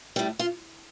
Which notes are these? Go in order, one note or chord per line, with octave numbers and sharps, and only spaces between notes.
A2 G3
F4